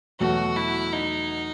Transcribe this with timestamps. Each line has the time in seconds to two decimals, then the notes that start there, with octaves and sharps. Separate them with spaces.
0.20 E2 B2 F#3 A3 F#4
0.56 E4
0.93 D#4